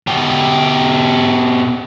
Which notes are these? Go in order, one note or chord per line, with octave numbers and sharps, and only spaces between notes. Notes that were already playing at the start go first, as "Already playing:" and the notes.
B2 G4